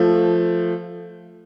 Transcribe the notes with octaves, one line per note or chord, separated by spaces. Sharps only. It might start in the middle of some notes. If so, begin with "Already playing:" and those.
Already playing: F3 A3